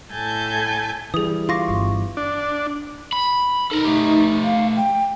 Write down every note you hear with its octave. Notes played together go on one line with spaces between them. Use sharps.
A2 A4 G#5 A5 G6
E3 G3 G#4 D#6
F4 F5 C#6 D6 A#6
G1
D4
B5
D#4 A4 A#4
A3 G4
F5
G5